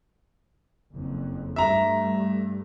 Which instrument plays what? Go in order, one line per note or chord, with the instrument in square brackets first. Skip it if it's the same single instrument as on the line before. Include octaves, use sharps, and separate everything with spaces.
[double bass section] F#1 F2
[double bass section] G2 A3 [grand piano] E5 A#5